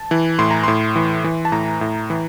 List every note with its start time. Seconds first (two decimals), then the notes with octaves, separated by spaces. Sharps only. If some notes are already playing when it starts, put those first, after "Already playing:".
Already playing: A5
0.11 E3
0.39 A2 C6
0.51 A#5
0.64 A2 C6
0.96 E3
1.24 E3
1.45 A5
1.52 A2 A#5
1.81 A2
2.10 E3